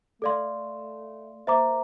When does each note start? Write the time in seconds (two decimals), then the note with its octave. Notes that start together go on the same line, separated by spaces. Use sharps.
0.22 A3 A4 D5 F5 C6
1.47 A#3 C5 E5 A#5 D6